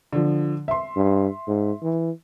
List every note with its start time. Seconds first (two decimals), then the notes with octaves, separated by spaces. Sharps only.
0.13 D3 F3
0.68 E5 C6
0.96 G2
1.48 G#2
1.83 E3